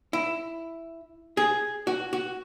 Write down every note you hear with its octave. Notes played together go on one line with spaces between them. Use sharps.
E4
G#4
F#4
F#4